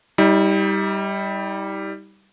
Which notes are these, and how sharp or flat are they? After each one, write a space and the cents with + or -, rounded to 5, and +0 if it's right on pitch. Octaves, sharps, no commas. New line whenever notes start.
G3 +0 D#4 +40